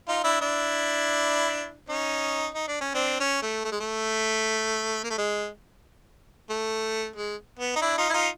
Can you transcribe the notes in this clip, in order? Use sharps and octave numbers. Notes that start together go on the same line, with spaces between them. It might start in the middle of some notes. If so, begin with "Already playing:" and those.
D#4 F4
D4 E4
D4 E4
C#4 D#4
D#4
D4
C#4
C4 D4
C#4
A3
A3
G#3
A3
A#3
A3
G#3
A3
G#3
B3
D#4
D4 E4
D#4 F4
E4
D#4 F4